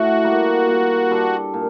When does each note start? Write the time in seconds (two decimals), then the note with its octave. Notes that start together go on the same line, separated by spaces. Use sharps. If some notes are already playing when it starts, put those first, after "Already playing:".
Already playing: A2 F#4
0.24 G3 A#3
0.67 A#2
1.11 G3 D4 A4
1.54 A#2